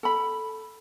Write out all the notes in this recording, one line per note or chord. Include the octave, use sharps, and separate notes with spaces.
A4 B5